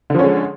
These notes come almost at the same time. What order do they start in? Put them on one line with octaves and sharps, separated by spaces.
D3 F3 C#4 G#3